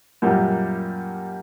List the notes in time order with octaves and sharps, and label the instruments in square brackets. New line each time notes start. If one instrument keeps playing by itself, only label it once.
[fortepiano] F#2 A#2 G3